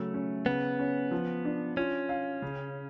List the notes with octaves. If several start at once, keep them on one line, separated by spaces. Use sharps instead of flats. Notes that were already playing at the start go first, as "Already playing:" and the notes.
Already playing: C#3 F#3 A3
C#4
C#3 B3
C#4
F3
D4
C#4 F4
F5
C#3